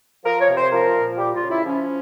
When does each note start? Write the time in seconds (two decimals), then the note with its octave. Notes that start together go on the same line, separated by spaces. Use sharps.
0.24 F3 A#4
0.40 C#5
0.49 C3
0.57 C5
0.72 F3 A#4
0.95 A#2
1.18 G3 G4
1.35 F4
1.42 C#3
1.50 E4
1.65 F3 C#4